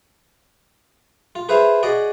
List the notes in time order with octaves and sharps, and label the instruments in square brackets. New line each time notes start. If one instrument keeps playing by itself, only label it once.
[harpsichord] F4
G#4 B4 C5 E5 F5
F#4 G#4 D5 D#5